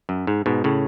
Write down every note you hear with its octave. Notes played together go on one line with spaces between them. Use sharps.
F#2
G#2
G#2 B2
A2 C#3